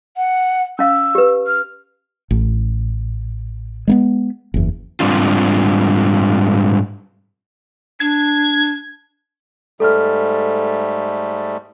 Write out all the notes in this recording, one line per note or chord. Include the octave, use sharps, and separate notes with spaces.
F#5
C#4 F5 E6
G4 B4
F6
A1
G#3 A#3 B3
F#1 E2
G#2 C3 G3 C4 D4 F4
D4 G#6
G#2 G3 A3 A4 F6